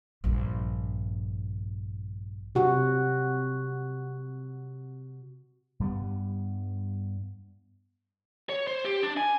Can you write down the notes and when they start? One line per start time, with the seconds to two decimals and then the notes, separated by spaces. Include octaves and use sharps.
0.24 A#1 G2
2.55 C3 F#4
5.80 G2 G3 B3
8.49 C#5
8.67 C5
8.85 G4
9.03 D4
9.17 G#5